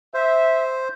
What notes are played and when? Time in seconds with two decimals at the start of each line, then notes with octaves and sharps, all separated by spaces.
0.14 C5 E5